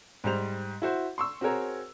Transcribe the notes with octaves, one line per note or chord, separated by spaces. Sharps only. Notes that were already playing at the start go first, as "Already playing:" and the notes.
G#2 G3 C5 F7
E4 F#4 C5
C6 C#6 E6
C4 F#4 G#4 A#4 C#5